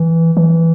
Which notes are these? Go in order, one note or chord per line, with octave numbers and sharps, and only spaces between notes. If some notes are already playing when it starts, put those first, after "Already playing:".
Already playing: E3
E3